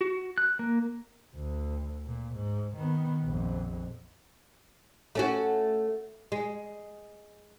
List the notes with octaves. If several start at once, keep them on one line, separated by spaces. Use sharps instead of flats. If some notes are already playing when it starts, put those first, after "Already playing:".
F#4
F#6
A#3
D2
A#2
G#2
D#3 B3
A#1 F2
A3 C#4 F#4
G#3